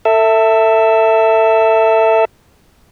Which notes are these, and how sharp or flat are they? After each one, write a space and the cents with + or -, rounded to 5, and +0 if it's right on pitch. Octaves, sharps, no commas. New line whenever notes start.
A4 +25 E5 +0